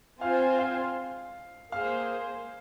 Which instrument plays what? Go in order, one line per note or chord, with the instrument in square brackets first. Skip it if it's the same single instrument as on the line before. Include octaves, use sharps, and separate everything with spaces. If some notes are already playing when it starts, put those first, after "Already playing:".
[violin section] C4 F4 C5 G#5 [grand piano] F5 F6
[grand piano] F5 F6
[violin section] A#3 G#4 C5 [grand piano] F5 F6